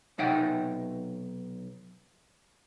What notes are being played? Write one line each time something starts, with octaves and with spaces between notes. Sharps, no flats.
B1 C3 D#4 E5 F#5 G5